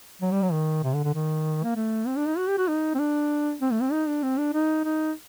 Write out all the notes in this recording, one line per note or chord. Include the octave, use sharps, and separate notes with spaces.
F#3
G3
F#3
D#3
C3
D3
D3
D#3
A#3
A3
C4
D4
D#4
F#4
G4
F#4
D#4
C4
D4
C4
A3
C4
D#4
D4
C4
D4
D#4
D#4